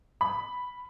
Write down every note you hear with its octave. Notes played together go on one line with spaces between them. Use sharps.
B5